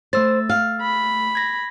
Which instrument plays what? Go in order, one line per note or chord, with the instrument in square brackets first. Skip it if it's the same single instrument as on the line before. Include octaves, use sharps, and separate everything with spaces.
[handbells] A3 E6 A6 [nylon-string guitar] C5
[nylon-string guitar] F5
[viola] B5
[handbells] G#6 A#6